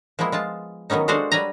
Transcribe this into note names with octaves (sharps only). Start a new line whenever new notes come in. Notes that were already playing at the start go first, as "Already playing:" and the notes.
F3 G#3 A#3 B3 E4
G#3 F4 A5
D#3 F#3 B3 C#4 D#4
G#3 D4 F#4 A4 C5 F5
F#3 G3 B4 G#5 A#5